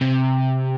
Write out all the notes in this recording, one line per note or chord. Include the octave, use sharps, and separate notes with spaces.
C3